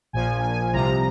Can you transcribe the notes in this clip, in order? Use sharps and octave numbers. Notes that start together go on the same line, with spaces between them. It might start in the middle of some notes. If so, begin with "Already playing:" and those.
A#1 A#2 F3 G#5
G#5
C2 C3 F3 A#5